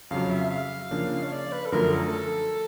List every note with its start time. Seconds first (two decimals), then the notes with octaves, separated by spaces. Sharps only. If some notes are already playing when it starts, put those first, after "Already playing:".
0.11 F2 C#3 F#3 F5
0.30 E5
0.44 E5
0.51 F5
0.91 C#3 F3 A#3 D4
1.23 C#5
1.32 D5
1.52 B4
1.65 A4
1.72 F#2 D3 F3 A3 A#4
1.93 A4
2.12 A4